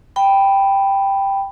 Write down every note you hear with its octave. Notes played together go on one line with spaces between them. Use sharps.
G5 B5